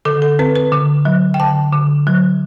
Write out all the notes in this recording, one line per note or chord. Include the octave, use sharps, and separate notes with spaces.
D3 A4
A4
C4 B4
B4
D3
F#3
G5
D3 A5
D3
F#3